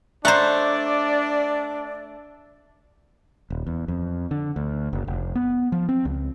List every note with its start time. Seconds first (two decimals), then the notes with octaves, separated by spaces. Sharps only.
0.25 A3 D4 C5 D5 F#5 A#5
3.50 D#1
3.67 E2
3.88 F2
4.31 D3
4.56 D2
4.93 F#1
5.08 F1
5.35 B3
5.72 F3
5.89 C4
6.05 C#2